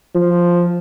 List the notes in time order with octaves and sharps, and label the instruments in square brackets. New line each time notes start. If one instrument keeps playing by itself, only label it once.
[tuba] F3